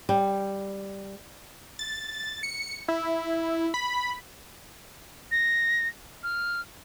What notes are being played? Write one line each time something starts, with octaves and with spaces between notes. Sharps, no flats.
G3
A6
C#7
E4
B5
A#6
F6